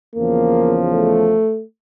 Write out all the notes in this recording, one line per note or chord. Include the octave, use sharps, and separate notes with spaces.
E2 C#3 F3 A#3
A3